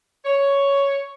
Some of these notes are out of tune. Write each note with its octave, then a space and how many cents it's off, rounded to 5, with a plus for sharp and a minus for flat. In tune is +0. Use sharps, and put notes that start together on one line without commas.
C#5 +5